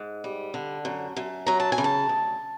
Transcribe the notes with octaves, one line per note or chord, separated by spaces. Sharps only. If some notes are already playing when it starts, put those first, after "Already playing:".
Already playing: G#2
G3
D3
F#2
F#2
F#3 A#5
A5
G#5
C#3
A5
D2